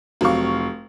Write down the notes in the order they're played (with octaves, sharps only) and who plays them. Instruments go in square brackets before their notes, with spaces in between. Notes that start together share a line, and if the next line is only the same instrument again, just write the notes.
[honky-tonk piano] F1 F#3 C4 F5 C#6